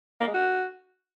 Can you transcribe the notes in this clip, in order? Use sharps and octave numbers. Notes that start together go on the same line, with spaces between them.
A#3
G#3
F#4